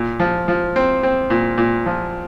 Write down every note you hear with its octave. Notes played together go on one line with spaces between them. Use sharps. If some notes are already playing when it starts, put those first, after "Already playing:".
Already playing: A#2
F3
F3
C4
C4
A#2
A#2
F3